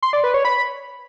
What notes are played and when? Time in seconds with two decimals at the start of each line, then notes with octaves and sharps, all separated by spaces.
0.03 C6
0.13 D5
0.24 B4
0.34 C#5
0.45 B5